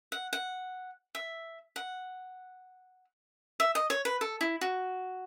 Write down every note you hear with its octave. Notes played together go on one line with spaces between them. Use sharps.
F#5
F#5
E5
F#5
E5
D#5
C#5
B4
A4
E4
F#4